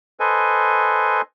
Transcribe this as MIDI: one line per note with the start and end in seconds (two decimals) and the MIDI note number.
0.20 1.21 69
0.20 1.21 71
0.20 1.21 72
0.20 1.21 75
0.20 1.21 80